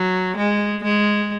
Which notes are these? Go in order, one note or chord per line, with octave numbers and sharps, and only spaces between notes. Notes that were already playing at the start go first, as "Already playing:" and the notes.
Already playing: F#3
G#3
G#3